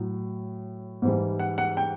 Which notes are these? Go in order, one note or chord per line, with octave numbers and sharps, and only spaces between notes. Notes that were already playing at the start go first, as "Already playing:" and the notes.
Already playing: A2 F#3
G#2 E3 G3
F#5
F#5
G5